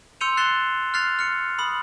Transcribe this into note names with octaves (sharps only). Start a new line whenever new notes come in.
C6 E6 G6 C#7 D#7 F7
F#6 A6 C7 E7 G7
F6 F#6 A6 C7 F7
F6 C#7
B5 D#6 F#7